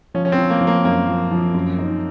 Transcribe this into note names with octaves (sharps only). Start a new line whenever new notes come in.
F3 C#4
C#4
C4
F3
A#3
F3
A#3
F#2 A#3
F3
F3
F#2
D#4